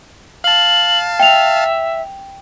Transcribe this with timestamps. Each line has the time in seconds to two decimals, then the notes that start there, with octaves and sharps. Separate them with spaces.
0.44 F5 A5 F#7
1.20 E5 G5 F7